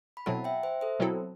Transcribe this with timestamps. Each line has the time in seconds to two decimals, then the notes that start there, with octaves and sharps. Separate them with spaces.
0.17 B5
0.26 B2 F#3 C4 E4 A4 F#5 A5
0.44 E5 G5
0.63 C5 E5
0.81 A4 C5
0.99 B2 F#3 C4 E4 A4